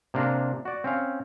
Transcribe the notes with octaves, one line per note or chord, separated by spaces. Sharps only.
C3 A#3 D4 F5 A#5
F#4 D5
C4 C#4 F5